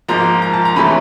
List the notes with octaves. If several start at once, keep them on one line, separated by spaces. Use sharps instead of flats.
G#2 F3 A#3 A#5
A#5
A5
A#5
C#3 E3 A3 C#4 B5